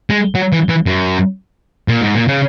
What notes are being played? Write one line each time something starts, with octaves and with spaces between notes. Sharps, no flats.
G#3
F#3
E3
E3
F#2
A#2
G#2
A#2
C#3